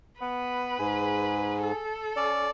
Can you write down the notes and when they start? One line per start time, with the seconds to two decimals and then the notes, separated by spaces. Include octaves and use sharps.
0.21 B3 B4
0.79 G#2 G#4
1.63 A4
2.17 C#4 D5